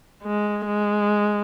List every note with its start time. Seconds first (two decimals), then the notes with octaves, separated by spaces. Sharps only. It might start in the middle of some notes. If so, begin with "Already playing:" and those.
0.23 G#3
0.67 G#3